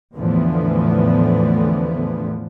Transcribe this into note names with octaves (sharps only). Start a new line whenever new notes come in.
E2 A2 D3 E3 F3 B3